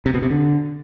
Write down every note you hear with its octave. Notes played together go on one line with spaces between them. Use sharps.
C3
B2
C3
D3